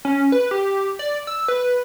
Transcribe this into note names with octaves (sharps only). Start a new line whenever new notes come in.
C#4
B4
G4
D5
E6
B4